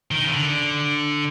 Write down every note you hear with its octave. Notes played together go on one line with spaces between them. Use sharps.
D#3
C#3
D3